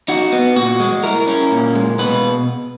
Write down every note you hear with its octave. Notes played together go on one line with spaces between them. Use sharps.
D#4 F#4
B3
A#2 F#4
G#3
E4 A#4
C#4
A#2
G#3
B2 B4